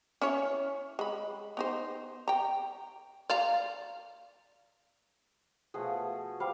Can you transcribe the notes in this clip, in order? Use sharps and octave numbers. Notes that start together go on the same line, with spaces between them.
C#4 E4 C#5
G#3 B5
B3 D#4 C5
G5 A#5
D5 F5 A#5
B2 F3 A3 G#4
G3 C5 F5